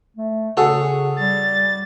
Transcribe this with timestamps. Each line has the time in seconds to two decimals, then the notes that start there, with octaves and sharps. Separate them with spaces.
0.17 A3
0.57 C#3 F#4 G#4 A4 C#5 F#5
1.19 G3 A6